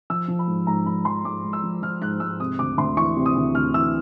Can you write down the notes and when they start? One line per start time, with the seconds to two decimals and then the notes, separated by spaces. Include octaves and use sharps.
0.10 F3 E6
0.28 F3
0.39 B5
0.47 G#2
0.67 G#2 A#5
0.86 F3 B5
1.05 F3 C6
1.25 G#2 D6
1.44 G#2
1.53 E6
1.63 F3
1.82 F3 F6
2.02 G#2 F#6
2.20 G#2 E6
2.40 C3 D#6
2.59 D2 D6
2.78 D2 C6
2.97 E3 C#6
3.17 C3
3.26 D#6
3.36 D2
3.55 D2 F6
3.74 E3 E6